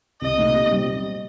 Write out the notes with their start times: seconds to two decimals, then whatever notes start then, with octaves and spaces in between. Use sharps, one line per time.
0.21 C2 D#5
0.38 A#2 A3 D#4
0.55 C3
0.71 G3 C4